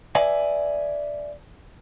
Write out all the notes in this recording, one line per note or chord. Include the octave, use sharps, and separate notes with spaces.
B4 D5 E5 G#5